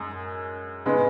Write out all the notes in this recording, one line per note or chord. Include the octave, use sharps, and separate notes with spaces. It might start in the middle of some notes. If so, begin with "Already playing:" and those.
Already playing: F#2 G#3
C#3 G#3 B3